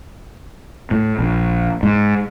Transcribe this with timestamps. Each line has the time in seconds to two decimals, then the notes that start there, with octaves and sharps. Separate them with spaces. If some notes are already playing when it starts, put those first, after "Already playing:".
0.91 A2
1.19 A#1
1.83 G#2